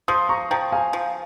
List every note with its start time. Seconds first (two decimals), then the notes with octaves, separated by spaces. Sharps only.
0.08 F3 C6 D#6
0.29 A#5 C#6
0.51 F3 G5 A#5
0.72 F5 G#5
0.93 F3